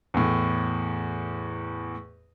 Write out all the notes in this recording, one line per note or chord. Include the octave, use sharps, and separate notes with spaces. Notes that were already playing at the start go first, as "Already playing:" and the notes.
E2 A2